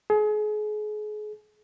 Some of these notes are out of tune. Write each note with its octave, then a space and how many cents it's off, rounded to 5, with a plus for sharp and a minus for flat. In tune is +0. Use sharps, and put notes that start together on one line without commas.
G#4 +35